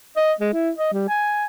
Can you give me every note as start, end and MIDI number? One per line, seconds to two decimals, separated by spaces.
0.16 0.32 75
0.40 0.51 56
0.53 0.70 64
0.78 0.91 75
0.93 1.07 55
1.09 1.46 80